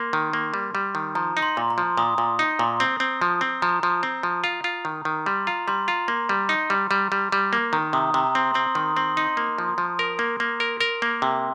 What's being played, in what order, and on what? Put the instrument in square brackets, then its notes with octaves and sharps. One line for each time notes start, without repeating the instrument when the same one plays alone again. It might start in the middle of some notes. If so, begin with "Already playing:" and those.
Already playing: [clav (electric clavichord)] A#3 [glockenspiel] C6
[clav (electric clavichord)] D#3
A#3
G3
G3
D#3
[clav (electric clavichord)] F3 [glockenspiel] A#5
[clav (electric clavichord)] D#4
[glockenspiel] C6
[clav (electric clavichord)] A#2
[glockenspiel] A#5
[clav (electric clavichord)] F3
[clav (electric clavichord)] A#2 [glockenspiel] D#6
[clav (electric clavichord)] A#2
D#4
A#2
C4
C4
F3
C4
[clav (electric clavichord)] F3 [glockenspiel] A#5
[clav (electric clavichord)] F3
C4
F3
F4
F4
D#3
D#3
[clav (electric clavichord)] G3 [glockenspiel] C6
[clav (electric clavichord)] F4 [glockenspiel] A#5
[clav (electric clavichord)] G3 [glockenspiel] C6
[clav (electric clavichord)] F4 [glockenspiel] A#5
[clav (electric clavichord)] A#3 [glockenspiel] C6
[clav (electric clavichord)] G3
D#4
G3
G3
G3
G3
A#3
[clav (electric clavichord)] D#3 [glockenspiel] A#5
[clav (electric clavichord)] C3 [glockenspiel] D#6
[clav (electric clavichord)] C3 [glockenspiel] A#5
[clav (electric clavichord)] C4 [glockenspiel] C6
[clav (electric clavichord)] C4 [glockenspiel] C6
[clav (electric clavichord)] D#3 [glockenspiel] C6
[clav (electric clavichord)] C4 [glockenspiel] C6
[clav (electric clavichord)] D#4 [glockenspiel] C6
[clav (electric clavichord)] A#3
F3
F3
A#4
A#3
A#3
A#4
A#4
A#3
C3